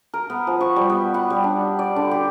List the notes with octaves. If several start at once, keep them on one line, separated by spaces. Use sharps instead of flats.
A#4
B3
F3
C#6
G3
B3
F#5
G3
D4
D5
D3
G4